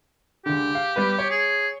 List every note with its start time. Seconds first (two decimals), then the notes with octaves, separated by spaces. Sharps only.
0.46 C#2 D3 G4
0.75 F5
0.96 G3 B3 B4
1.19 C#5
1.31 G#4